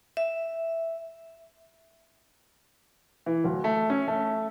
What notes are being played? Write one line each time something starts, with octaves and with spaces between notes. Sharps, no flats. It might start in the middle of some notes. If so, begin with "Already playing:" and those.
E5
E3
D1
A3
C#4
A3